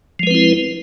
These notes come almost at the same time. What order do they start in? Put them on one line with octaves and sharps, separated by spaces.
F3 G#3 B4 C4 E4